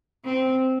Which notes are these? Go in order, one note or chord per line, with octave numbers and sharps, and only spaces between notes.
C4